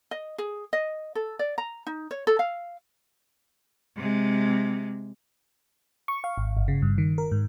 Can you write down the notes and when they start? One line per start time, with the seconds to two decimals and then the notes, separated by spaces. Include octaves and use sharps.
0.11 D#5
0.38 G#4
0.73 D#5
1.15 A4
1.39 D5
1.58 A#5
1.87 D#4
2.11 C#5
2.27 A4
2.39 F5
3.97 C3 G#3
6.08 C#6
6.24 F5
6.38 G#1
6.57 G1
6.68 C#3
6.82 G2
6.98 D#3
7.18 A#4
7.32 G#2